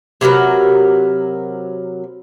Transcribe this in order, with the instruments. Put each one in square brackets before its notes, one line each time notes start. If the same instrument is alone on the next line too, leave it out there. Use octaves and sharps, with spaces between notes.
[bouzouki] C3 F#3 A#4 B4